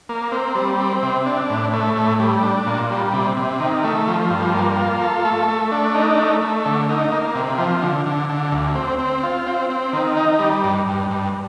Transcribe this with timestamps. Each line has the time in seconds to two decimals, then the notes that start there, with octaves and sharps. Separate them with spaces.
0.09 A#3
0.32 C4
0.55 G3
0.80 C4
1.03 C3
1.26 D4
1.50 A2
1.73 A3
1.96 A2
2.20 G3
2.43 D4
2.67 A#2
2.91 G3
3.13 C3
3.37 C3
3.60 D#3
3.84 A3
4.08 F3
4.30 G2
4.54 A#3
4.77 F4
5.02 A4
5.25 A3
5.48 A3
5.72 D4
5.95 D#4
6.18 A3
6.41 A3
6.66 D3
6.89 D#4
7.12 A#3
7.35 C3
7.58 F3
7.82 D3
8.06 D3
8.29 D3
8.52 D2
8.75 C4
8.99 C4
9.23 F4
9.47 C4
9.70 C4
9.93 D#3
10.17 D#4
10.39 G3
10.64 G2
10.87 G2
11.10 G2